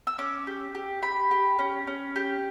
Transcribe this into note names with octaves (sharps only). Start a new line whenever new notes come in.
E6
C#4 D6
G4
G4
G4 B5
G4
C#4
C#4
G4